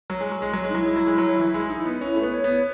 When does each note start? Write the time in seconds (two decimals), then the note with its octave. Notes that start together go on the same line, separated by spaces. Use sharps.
0.10 F#3
0.21 G#3
0.31 F#3
0.42 G#3
0.53 F#3
0.64 G#3
0.70 D#4
0.73 F#3 E4
0.86 G#3
0.96 F#3
1.07 G#3
1.18 F#3
1.37 E3
1.54 G#3
1.69 D#4
1.85 B3
2.01 C#4 E4
2.16 A3
2.22 B3 B4
2.33 C#5
2.44 B3